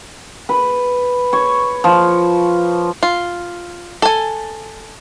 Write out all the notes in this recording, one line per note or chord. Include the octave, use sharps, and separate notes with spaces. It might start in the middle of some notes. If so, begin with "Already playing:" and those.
B4
C#5
F3
F4
A4 G#5